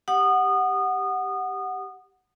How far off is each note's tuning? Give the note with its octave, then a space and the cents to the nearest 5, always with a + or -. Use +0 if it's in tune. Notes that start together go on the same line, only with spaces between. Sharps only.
G4 +0 F#5 +0 D#6 -25